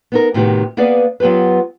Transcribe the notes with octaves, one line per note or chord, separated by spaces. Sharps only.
B3 D#4 A#4
A2 C3 D#3 B3 F#4 G4
A#3 B3 G#4 B4 D5 F5
F#3 B3 F4 G4 B4